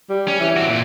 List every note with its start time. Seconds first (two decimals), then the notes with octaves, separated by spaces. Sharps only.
0.10 G3
0.28 C#4
0.40 E3
0.57 C4 F#4
0.69 A#2